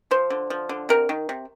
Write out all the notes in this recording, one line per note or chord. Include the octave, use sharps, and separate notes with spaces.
F3 C5
D3
F3
D3
C3 A#4
D#3
C3